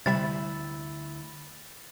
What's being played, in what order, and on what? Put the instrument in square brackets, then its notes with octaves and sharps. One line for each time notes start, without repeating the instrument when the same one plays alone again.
[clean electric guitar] D2 E4 [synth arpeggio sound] C3 G3 E5 [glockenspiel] A6